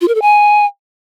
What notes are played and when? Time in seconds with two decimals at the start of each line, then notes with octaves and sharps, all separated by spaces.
0.01 F4
0.08 A#4
0.15 A4
0.22 G#5